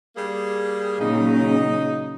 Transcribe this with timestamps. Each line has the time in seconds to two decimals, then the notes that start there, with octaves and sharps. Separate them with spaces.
0.17 G3 A#3 G#4
1.00 A#2 C#3 F#3 D#4